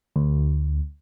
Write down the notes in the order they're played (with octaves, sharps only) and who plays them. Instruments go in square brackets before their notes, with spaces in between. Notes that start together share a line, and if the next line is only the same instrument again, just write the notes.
[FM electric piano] D2